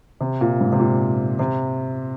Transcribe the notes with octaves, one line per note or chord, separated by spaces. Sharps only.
C3
A#2
G#2
C3
A#2
C3